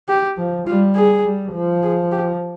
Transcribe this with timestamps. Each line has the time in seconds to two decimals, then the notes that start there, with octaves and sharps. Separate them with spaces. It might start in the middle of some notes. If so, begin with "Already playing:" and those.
0.08 G4
0.38 F3
0.67 G3 F4
0.95 G#4
1.24 G3
1.53 F3
1.83 G#4
2.12 G4